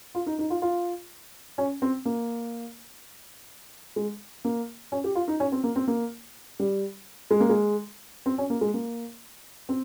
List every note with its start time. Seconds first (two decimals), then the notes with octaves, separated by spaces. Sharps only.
0.15 F4
0.26 D#4
0.39 D#4
0.50 F4
0.62 F4
1.58 C#4
1.82 C4
2.05 A#3
3.96 G#3
4.45 A#3
4.92 C#4
5.04 G4
5.15 F4
5.28 D#4
5.40 C#4
5.52 C4
5.64 A#3
5.76 C4
5.88 A#3
6.60 G3
7.31 G#3
7.40 A#3
7.49 G#3
8.26 C4
8.38 C#4
8.50 A#3
8.61 G#3
8.74 A#3
9.69 C4